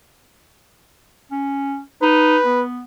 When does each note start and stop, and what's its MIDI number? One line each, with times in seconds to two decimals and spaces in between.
1.31 1.79 61
2.02 2.38 63
2.02 2.63 71
2.46 2.81 59